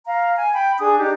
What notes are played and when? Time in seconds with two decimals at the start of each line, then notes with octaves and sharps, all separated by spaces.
0.05 F5 A#5
0.36 G#5
0.53 G5 B5
0.78 D4 G#4 D#6
0.98 D4 D#4 G4